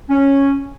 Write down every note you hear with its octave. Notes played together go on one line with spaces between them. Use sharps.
C#4